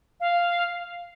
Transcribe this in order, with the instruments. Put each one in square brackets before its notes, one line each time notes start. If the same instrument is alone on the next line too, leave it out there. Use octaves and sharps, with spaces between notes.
[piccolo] F5